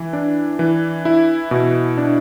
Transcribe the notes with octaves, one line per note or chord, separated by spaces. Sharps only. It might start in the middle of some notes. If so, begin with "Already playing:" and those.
Already playing: E3
D4
E3
E4
B2
D4